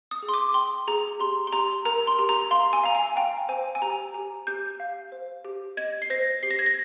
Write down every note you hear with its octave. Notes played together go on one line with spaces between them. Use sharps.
D#6
G#4
C6
D6
G5 C6
G#4 A#5
G4 C6
C6
G4 A#5
A#4 A#5
C6
G4
A#5
F5 C6
G#5
F5 A#5
G#5
F5 G5
C5 G#5
G#5
G4 A#5
G4
G4 G6
F5
C5
G4
D#5 G#6
C7
C5 A#6
G4 C7
A#6
G#6
A#6